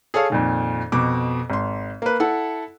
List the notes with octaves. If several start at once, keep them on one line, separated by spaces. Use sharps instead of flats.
G#4 A4 C#5 F5
F2 A#2 D#3
F2 B2 D6
G#1 C6
A#3 B4
E4 A4 F#5